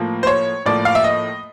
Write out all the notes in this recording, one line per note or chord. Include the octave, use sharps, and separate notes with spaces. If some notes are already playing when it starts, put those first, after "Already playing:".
Already playing: A2 F3 A#3
C5
C#5
A2 F3 A#3 D5
F5
E5
D#5